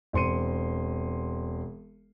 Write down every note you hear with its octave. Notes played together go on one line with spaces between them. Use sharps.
E1 C4 C6 C#7 D#7